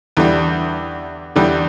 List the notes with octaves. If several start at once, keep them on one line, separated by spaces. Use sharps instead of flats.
E2 D3 G3
E2 D3 G3